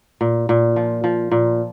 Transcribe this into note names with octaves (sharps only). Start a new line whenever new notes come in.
A#2
A#2
F3
F3
A#2